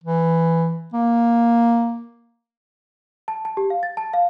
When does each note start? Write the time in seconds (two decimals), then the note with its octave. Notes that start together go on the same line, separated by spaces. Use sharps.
0.04 E3
0.93 A#3
3.28 A5
3.45 A5
3.57 G4
3.70 F5
3.83 A6
3.97 A5
4.14 F5